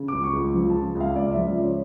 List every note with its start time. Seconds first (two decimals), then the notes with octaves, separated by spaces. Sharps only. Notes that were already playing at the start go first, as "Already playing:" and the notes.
Already playing: C#3
0.08 D6
0.13 C#2
0.23 C#6
0.34 C#2
0.54 F3
0.70 A5
0.75 C#3
0.95 C#2
1.00 F5
1.16 C#2 D5
1.31 E5
1.36 F3
1.47 D5
1.57 C#3
1.62 C#5